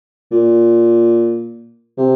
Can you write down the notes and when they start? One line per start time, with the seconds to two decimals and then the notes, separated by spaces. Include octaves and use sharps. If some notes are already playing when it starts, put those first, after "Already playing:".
0.32 A#2
1.98 C3